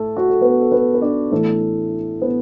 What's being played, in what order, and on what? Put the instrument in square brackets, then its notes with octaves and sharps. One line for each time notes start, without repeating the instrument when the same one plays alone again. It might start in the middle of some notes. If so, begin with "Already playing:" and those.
Already playing: [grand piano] A2 A3 A4
F#4
A4
B3 B4
A4
B3 B4
B4
D4 D5
A2 E3 A3 B3 A4
B3